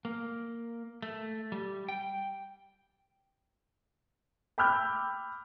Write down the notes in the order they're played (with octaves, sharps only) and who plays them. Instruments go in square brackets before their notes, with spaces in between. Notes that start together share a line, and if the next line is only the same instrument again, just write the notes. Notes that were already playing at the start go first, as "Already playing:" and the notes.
[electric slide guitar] A#3
A3
G3
G5
[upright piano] G5 B5 D6 E6 F6 G6